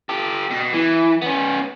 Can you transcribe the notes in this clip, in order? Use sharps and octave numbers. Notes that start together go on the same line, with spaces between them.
G4 A4
B2
E3
B3 C#4